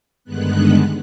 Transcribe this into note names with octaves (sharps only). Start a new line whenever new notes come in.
G2 D3 D#3 G#3 B3 F#6